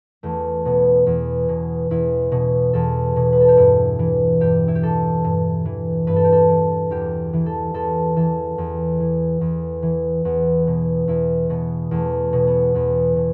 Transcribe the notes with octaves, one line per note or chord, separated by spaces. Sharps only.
E2 A3
B2 B3
E2
B2
E2 E4
B2
E2 A4
B2
B4
A4
G4
G2 E4
E3
G2 G4
E4
G4
E3 A4
G2
E3
G2 B4
A4
G4
A4
E3
E2 G4
E3
A4
E2 A4
E3 A4
E2
E3
E2
E3
E2 B3
B2
E2 E4
B2 B3
E2 A3
B2
B3
E2 B3
B2